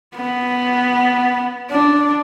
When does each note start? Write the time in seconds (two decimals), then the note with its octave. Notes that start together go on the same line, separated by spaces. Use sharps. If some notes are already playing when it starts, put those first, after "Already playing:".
0.15 B3
1.71 D4